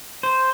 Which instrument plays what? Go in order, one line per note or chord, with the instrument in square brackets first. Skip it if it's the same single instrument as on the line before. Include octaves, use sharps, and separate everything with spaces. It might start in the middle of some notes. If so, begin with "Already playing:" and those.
[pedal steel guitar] C5